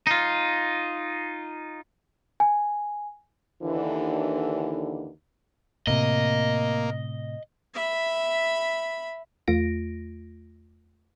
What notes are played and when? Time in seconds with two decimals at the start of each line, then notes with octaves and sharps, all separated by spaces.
0.07 D#4 F4
2.40 G#5
3.62 D#2 D3 E3
5.87 A2 C3 A#3 D#5
7.74 E5 B5
9.48 E2 A3 F4 A#6 D7